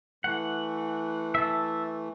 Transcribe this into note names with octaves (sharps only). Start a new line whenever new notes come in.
E3 A3 F#5
E5 A5